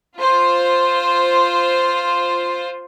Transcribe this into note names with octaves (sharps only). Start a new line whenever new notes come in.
F4 C5